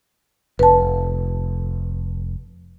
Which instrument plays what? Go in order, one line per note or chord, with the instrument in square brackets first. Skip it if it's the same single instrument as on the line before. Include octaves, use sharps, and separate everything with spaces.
[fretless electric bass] F1 [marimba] B4 A5